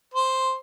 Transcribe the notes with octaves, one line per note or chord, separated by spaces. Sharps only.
C5